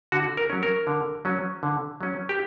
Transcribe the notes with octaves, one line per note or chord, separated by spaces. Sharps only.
D3 F#4
A#4
F#3 C#4
A#4
D3
F#3 C#4
D3
F#3 C#4
G4